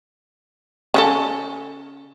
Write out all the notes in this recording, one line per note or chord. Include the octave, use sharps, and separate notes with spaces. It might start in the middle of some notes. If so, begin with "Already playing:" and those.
C#3 C#4 A4